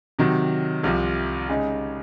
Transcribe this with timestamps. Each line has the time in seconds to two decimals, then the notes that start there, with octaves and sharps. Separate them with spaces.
0.19 C3 D#3 F#3
0.84 C2 C3 F3
1.49 C#3 G#3 D#4